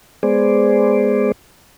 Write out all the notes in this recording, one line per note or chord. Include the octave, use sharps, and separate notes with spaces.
G#3 B3 G#4 C5 D5